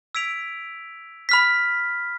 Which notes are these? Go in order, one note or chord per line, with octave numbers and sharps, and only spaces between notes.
E6 G#6 B6 D7 F7
B5 F6 B6